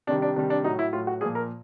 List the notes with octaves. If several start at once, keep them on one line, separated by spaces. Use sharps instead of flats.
C3 D#3 G3 D4
D4
C3 D#3 G3 D4
D4
A2 F#3 D#4
E4
A2 F#3 F4
F#4
A#2 F3 G#4
A#4